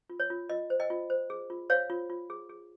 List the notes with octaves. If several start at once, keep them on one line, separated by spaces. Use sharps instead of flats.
F4
C#5
F4
F4 D#5
C5
D#5 G5
F4
C5
G#4
F4
C5 C#5 F5
F4
F4
G#4
G#4